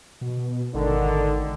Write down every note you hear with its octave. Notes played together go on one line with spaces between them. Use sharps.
B2
G#1 D3 D#3